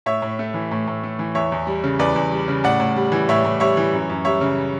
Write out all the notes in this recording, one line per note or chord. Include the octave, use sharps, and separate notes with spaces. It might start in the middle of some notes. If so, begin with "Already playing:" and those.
A2 C#5 E5
A2
A3
E3
A2
A2
A3
E3
E2 C#5 E5
E2
G3
C#3
E2 B4 D5
E2
G3
C#3
A2 D5 F#5
A2
G3
E3
A2 C#5 E5
A2
G3 C#5 E5
E3
F#2
F#2
G3 C#5 E5
C#3